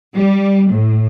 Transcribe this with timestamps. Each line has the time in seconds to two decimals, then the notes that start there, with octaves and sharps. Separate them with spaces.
0.14 G3
0.71 A2